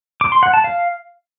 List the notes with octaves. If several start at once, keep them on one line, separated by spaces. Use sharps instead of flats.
D6
C6
F#5
A5
F5